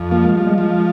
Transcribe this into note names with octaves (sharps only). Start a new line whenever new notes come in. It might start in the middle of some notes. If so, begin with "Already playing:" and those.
Already playing: F2
F3 A#3
G#3
F3 G3
G#3
F3